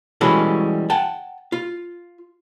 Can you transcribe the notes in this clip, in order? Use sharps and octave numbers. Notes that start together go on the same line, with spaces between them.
E3 G3 G#3 C#4 F#4 A4
F#5 G5 A5
F4